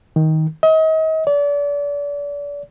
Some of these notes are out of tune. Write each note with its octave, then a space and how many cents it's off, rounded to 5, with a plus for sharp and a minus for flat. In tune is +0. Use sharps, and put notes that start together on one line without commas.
D#3 +15
D#5 +35
D5 -35